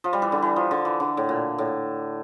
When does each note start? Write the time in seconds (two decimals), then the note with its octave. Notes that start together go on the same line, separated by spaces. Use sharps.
0.04 F3
0.13 G3
0.22 E3
0.32 D3
0.42 E3
0.56 F3
0.71 D3
0.85 E3
1.00 D3
1.17 A2
1.29 A#2
1.58 A2